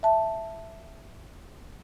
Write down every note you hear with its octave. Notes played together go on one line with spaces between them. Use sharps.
E5 A5